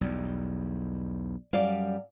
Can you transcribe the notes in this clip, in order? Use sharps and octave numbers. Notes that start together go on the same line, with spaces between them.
B1 E2 G3
F#2 G3 D5 F5